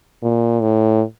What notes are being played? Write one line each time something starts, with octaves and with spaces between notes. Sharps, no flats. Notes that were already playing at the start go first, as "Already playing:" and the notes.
A#2
A2